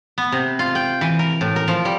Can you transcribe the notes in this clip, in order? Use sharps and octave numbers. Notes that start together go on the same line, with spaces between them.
B3
C3
F4
G5
E3
A#4
A2
A#4
F3
G3